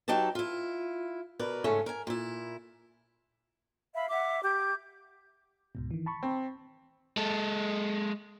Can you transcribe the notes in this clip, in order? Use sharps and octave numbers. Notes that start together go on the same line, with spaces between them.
F#3 D#4 G4 B4 A5
E4 F4
B2 A#4 B4 D5
G#2 C#3 A3 C#4
A#4 G#5
A#2 E4
E5 F5 B5
E5 F#5 D6
G4 D6 G6
C#2 G#2 B2
D#3 E3
A5 B5 C#6
C4
G#3 A4